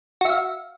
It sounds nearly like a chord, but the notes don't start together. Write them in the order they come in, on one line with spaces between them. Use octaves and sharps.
F#4 E5 F5